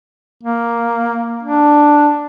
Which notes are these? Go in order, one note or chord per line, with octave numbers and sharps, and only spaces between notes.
A#3
D4